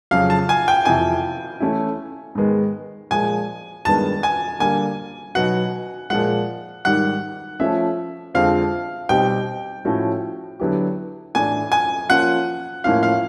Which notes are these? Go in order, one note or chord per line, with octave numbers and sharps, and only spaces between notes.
F2 C#3 F#3 F5
A5
G#5
G5
F2 C3 E3 G#5
E3 A3 C#4 E4
G#2 D#3 G#3 B3
A#2 F3 G#3 G#5
G2 D#3 G#3 B3 A5
G#5
D3 G3 A#3 G#5
B2 F#3 B3 D#4 F#4 F#5
A#2 F3 G#3 F#5
G#2 D#3 G3 F#5
F3 A3 C#4 E5
F2 D3 F3 G#3 C4 F5
B2 G3 C4 D#4 G4 G5
A2 F3 A3 C#4 F#4
D3 F#3 B3 E4 G4
A2 E3 A3 D4 G#5
G#5
F3 A#3 C#4 F4 F#5
A2 F3 A#3 C#4 F4 F5
F5